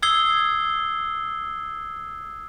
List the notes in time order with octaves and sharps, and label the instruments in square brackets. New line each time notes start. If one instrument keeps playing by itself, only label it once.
[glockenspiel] D#6 E6 G#6 C7 G7